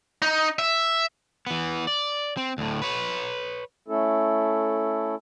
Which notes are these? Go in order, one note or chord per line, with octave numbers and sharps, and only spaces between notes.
D#4
E5
E3 B3
D5
C4
D2 A2
B4 C#5
A3 C#4 E4 A4